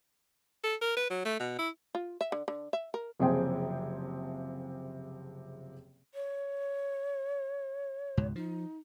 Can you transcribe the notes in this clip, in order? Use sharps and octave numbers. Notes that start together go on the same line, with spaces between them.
A4
A#4
B4
F#3
A3
B2
E4
F4
E5
D3
D3
E5
A#4
F#1 C3 F3 G#4 C5 G5
C#5
C#2 G#2 B2
F3 D#4